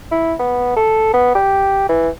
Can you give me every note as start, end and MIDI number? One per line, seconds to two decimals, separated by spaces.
0.11 0.34 64
0.39 0.73 59
0.76 1.10 69
1.13 1.33 59
1.35 1.85 67
1.89 2.09 52